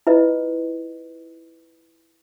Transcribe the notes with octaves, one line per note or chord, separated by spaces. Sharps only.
E4 F4 B4 D#5